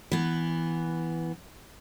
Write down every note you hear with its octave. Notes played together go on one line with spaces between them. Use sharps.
E3 B3